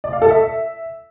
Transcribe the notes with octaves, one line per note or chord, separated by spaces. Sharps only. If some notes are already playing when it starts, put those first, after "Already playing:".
D5
F5
A4
E5